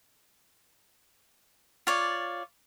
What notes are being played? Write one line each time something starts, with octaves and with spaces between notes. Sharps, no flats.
F4 C#5 D5